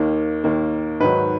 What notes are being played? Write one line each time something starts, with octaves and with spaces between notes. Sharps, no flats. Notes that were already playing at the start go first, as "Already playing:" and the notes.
Already playing: D#2 D#3 A#3
D#2 D#3 A#3
G#2 D#3 F#3 B4